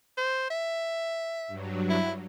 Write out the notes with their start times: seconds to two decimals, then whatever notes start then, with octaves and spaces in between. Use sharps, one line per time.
0.18 C5
0.50 E5
1.47 G2 F#3
1.89 E4